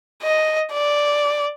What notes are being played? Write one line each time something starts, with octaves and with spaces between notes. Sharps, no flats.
D#5
D5